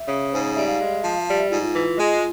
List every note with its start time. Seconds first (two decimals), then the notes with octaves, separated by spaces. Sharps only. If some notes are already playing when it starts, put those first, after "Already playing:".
Already playing: E5
0.08 C#3
0.31 G#2 C5
0.43 C#5
0.55 G3 E5
0.67 F5
0.79 G#3
1.02 F3
1.27 G3 F5
1.38 E5
1.50 G#2 F4
1.62 F4
1.73 E3
1.98 G#3